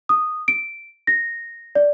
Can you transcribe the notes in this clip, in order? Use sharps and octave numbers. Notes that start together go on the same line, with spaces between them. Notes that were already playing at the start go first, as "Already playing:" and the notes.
D#6
D7
A#6
D5